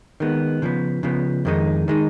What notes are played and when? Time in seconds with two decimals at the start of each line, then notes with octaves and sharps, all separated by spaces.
0.20 D#3 G#3 B3
0.62 C#3 F3 B3
1.03 C#3 F3 B3
1.45 F2 D#3 G#3 D#4
1.88 D#3 G#3 D#4